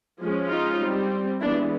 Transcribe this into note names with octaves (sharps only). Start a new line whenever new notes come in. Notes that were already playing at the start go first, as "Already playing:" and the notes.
F3 G#3 C#4
D#4 F4
G3 C4
E3 G#3 B3 D4 E4